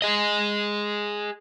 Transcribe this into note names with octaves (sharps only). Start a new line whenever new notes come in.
G#4 D#5